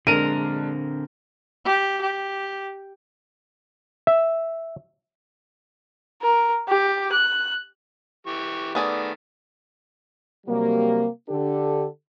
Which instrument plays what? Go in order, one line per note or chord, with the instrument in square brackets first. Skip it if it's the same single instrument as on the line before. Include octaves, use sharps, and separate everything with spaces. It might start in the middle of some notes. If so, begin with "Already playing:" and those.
[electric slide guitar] D3 C4 [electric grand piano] G#3 D4 [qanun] A#4 A#5 [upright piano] D#7
[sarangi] G4
G4
[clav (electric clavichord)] E5
[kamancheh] A#4
G4
F#6
[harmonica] E3 G4 C#6
[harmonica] D#3 A3 [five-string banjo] B3 G#4 D5
[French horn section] C3 F#3 G3 A#3
D3 D4 G4 A4